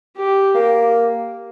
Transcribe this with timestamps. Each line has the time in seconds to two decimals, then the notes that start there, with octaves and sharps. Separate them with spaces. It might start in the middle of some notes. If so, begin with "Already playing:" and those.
0.16 G4
0.54 A#3